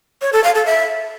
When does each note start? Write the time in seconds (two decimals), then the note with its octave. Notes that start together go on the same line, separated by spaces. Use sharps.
0.22 C#5
0.33 A4
0.44 F5
0.55 A4
0.66 E5